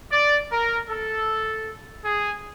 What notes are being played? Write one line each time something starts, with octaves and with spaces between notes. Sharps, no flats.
D5
A#4
A4
G#4